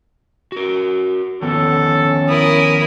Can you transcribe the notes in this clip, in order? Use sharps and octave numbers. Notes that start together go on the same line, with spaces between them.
F#4 A#4
D#3 F3 B3 C#4 A4
E4 A#4 D#6